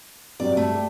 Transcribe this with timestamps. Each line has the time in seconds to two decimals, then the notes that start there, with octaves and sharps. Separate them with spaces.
0.40 G2 C3 F#3 D5
0.57 G2 A3
0.72 G4 D5